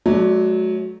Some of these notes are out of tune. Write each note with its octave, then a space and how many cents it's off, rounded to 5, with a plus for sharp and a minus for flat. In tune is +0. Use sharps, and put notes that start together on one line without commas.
F#3 +0 A3 -40 D5 +0